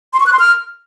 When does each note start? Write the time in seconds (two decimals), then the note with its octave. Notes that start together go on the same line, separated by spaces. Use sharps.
0.13 C6
0.20 C#6
0.26 F#6
0.33 C6
0.39 F6